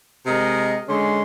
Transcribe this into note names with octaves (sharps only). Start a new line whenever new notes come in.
C3 G#3 A#4 D#5
D3 G#3 C#4 C6